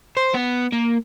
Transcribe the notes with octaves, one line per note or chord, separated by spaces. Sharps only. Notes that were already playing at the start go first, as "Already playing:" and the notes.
C5
B3
A#3